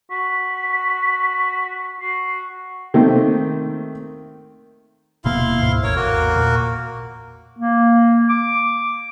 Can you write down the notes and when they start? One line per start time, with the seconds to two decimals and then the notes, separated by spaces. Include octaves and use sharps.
0.11 F#4 B6
2.01 F#4 C7
2.94 D#3 A3 A#3 C4
5.25 D#1 B2 A#3 E4 F5 C6
5.59 D2 G#2
5.83 A1 E2 A#4 C#5
5.96 A#3 F#4 A#4
6.36 A#2
7.57 A#3
8.29 D6